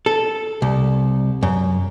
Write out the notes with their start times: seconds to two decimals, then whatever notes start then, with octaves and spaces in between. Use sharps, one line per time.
0.06 A4
0.62 C2
1.43 F#2